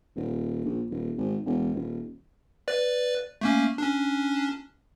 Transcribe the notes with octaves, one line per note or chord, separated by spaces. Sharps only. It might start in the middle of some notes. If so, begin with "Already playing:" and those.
D#1
A#1
D#1
G#1
E1
D#1
B4 D5
A3 A#3 C#4
C#4 D4